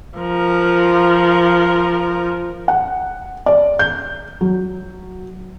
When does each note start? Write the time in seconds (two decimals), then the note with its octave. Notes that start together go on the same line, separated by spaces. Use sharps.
0.18 F3 A#4
2.68 F#5
3.46 D5
3.79 G6
4.41 F#3